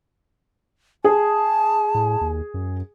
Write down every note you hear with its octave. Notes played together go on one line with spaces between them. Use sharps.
G#4 A5
A2
D#2
F#2